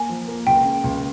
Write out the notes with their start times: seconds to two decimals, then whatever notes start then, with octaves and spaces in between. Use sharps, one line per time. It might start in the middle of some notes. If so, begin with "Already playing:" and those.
Already playing: A#3 G#5
0.09 F3
0.28 A#3
0.47 C#2 G5
0.65 C#3
0.84 C#2